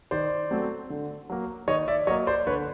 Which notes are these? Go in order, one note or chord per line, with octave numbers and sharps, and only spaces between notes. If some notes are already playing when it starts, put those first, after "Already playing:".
D#3 C5 D5
F#3 A3 C4
D3
F#3 A#3
D#3 C#5 D#5
D5 E5
F#3 A#3 C#5 D#5
C5 D5
D3 B4 C#5